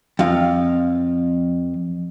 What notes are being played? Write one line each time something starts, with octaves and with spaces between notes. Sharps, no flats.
F2 F5